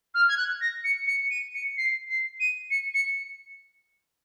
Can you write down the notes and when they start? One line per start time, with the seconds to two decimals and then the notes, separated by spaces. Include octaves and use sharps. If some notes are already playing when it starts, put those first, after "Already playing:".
0.14 F6
0.28 G#6
0.37 F#6
0.61 A#6
0.84 C#7
1.07 C#7
1.30 D#7
1.54 C#7
1.77 C7
2.09 C7
2.40 D#7
2.70 C#7
2.94 C#7